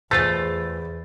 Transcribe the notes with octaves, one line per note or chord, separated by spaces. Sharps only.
E2 G#3 A3 F4 C5 A6